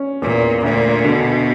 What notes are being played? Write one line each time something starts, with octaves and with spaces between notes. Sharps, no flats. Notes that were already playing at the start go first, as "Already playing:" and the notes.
Already playing: C#4
E2 A#2
D2 A#2
B2 D3